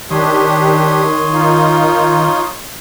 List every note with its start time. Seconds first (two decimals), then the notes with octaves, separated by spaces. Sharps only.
0.11 D#3 D4 G4 C#5 C6 D#6
1.32 D#4 F4